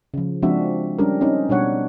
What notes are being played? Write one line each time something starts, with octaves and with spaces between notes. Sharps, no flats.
C#3 F3
F3 G#3 C4 D4 F#4 E5
G3 C#4 D4 G4 A#4
C4 C#4 D#4
B2 G3 D4 C#5 F#5